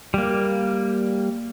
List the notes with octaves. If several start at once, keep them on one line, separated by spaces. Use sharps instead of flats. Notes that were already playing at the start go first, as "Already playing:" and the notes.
G3 A#3